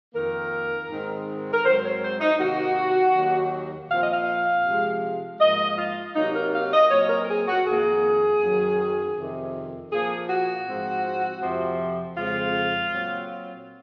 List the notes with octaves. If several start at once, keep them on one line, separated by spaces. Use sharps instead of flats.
F2 D#3 A#3 A#4
G#2 D#3 G#3 C4
A#4
G#2 F#3 C4 C5
C#5
C5
D#4
C3 D#3 A#3 F#4
D#2 D#3 F#3 A#3
A#2 F3 C4 F5
D#5
F5
C3 F3 G#3
G#2 F3 A#3 D#5
F4
C3 F#3 A#3 D#4
A#4
F5
D#5
A#2 F#3 C4 C#5
A#4
A#4
G#4
F#4
F2 D#3 A#3 G#4
F#2 D#3 F#3
F2 C3 D#3
A#2 F3 A#3 G#4
F#4
G#2 F3 C4
F2 C3 F3
F2 C#3 F3 G#3 C4 F4
A#2 F#3 C4